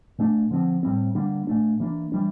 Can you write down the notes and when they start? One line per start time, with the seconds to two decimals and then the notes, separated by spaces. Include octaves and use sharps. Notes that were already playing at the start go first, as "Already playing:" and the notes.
0.18 A#2 A3 D4
0.51 D3 F3 C4
0.83 A2 G3 C4
1.15 D3 G3 A#3 D4
1.47 A#2 A3 D4
1.80 E3 A#3 D4
2.12 E3 G3 D4